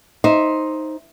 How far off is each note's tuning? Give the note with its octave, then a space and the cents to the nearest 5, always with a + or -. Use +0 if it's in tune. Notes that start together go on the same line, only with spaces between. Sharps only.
D#4 +5 C5 +10 E5 +0